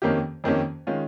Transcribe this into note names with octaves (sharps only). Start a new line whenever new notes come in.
F2 D#3 A#3 C#4 G4
F2 D#3 A#3 C#4 G4
D#3 G#3 C#4 F4